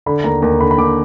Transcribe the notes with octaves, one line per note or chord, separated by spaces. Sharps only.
D3 B5
D#2 A#5
D#2 A#5
D3 B5
B5
D#2 D6